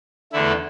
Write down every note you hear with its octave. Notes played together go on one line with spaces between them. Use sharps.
E2 D3 A3 E4